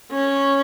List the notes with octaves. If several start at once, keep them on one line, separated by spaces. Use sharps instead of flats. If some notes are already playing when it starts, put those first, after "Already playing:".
C#4